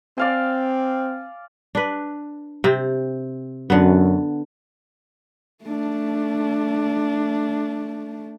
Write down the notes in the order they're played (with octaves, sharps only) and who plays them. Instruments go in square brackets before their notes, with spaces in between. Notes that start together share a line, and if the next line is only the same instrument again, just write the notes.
[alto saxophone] C4 [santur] D5 F5 G#5
[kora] D4 B4
C3 C4
[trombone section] F#2 [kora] D3 B3
[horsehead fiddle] A3 D4